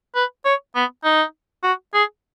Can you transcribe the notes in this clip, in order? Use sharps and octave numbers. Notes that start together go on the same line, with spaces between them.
B4
C#5
B3
D#4
F#4
G#4